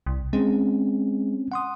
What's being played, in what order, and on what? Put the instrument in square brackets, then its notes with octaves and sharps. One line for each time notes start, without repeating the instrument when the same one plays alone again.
[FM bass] C2
[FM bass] G#3 [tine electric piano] C4 C#4
[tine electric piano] F#5 C6 D#6